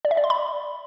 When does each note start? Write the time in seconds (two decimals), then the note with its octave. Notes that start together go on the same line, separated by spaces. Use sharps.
0.05 D5
0.11 E5
0.17 D5
0.24 C6
0.30 B5